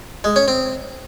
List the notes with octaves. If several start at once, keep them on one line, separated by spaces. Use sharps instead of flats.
G#3
C#4
C4